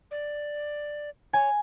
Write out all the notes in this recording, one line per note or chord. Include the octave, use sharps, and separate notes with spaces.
D5
C#5 G#5